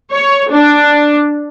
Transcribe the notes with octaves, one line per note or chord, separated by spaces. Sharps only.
C#5
D4